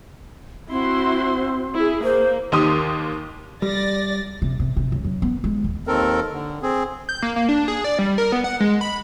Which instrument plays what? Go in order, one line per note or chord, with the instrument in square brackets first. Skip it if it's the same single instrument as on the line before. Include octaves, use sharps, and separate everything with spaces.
[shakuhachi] C4 [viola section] E4 F#4 C6
[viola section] E4 G#4
[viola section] A#3 [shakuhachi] C5
[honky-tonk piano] D#2 D#3 G4 C6 D#6
[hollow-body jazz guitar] G3 [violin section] D5 A6 A#6
[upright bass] C3
C3
C3
C#2
F#2
B3
G#3
D#2
[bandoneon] D#2 D#3 C4 A4 A#4
D3
C4 G#4
[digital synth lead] G6
A#3
A#3
D4
G#4
D5
G3
A#4
B3
F#5
G#3
B5